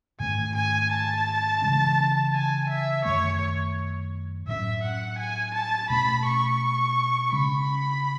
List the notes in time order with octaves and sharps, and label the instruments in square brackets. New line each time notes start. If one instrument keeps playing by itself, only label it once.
[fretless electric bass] G#2 D#3 A3 C#4 [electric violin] G#5
[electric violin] G#5
A5
[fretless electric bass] C#3 E3 G#3 C#4
[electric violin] G#5
E5
[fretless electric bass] F#2 D#3 A3 [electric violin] C#5
[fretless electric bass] A2 F#3 C#4 [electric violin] E5
[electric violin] F#5
G#5
A5
[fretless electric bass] B2 A3 C#4 [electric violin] B5
[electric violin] C#6
[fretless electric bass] C#3 G#3 C#4 [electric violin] B5